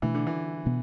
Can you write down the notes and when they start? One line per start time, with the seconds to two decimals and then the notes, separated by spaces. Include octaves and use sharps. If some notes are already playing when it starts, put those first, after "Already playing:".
0.02 B2 E3 A3 D4
0.15 D3
0.27 E3
0.66 B2 B3 D4